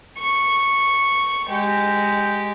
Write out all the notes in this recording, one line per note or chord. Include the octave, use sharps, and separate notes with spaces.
C#6
G#3 G4